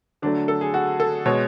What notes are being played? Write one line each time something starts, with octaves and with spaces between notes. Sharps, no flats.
D3 F#3 A3 D4
A4
G#4
F#4
A4
B2 G#3 C#5